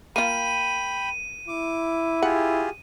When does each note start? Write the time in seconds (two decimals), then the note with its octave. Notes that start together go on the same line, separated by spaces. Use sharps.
0.16 A#3 F4 G5 B5 D#7
1.48 E4 D6
2.22 F4 G4 G#4 F#5